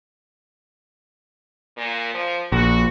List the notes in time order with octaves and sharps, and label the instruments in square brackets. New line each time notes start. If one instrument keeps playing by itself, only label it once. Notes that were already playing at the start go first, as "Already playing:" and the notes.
[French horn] A#2
F3
[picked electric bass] A#1 [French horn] F#4